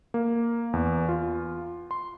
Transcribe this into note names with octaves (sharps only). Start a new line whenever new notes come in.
A#3
E2
F4
C6